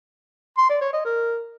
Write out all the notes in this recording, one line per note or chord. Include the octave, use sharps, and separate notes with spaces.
C6
D5
C#5
D#5
A#4